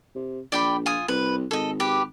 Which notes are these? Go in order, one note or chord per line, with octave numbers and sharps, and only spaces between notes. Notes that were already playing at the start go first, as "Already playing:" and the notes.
C3
A#1 D5 G5 B5
F4 G#5 D#6
C2 B4
G#1 A4 D#5
G4 B4